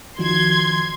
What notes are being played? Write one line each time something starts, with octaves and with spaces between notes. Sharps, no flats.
D#3 F3 F#4 C6 G#6